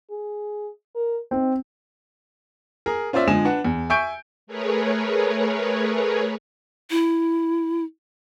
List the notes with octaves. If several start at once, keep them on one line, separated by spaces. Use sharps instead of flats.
G#4
A#4
C4 D#4
G#4 A#4
C#4 F4 C5 D5 E5
D3 F3 G#3 G#5 E7
D4 B4 F#5
E2
E5 G#5 C#6 G6 D7
A3 G#4 A#4 B4 C#5
E4